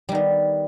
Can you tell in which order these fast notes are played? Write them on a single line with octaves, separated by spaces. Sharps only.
G3 D#3 B3